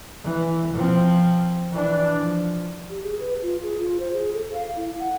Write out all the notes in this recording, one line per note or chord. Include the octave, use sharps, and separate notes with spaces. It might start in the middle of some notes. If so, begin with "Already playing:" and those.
E3
F3 C4
E3 D4
F3
G4
G#4
B4
F4
G#4
F4
C5
G#4
A4
F5
E4
F#5